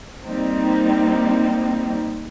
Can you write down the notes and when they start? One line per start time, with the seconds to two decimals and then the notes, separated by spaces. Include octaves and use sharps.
0.24 G3 A#3 C4 D#4